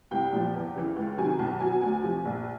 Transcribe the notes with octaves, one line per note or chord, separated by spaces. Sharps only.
C2 G5
A#2 F3
E2
C#3 E3
C#2
C3 D#3 F#3 G#5
B1 A5
B2 F#3 G#5
D2 G#5
C3 F3
A#1